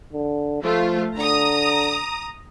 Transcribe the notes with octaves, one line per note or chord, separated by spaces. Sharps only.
D3
F3 A3 F4
D3 A#5 D#6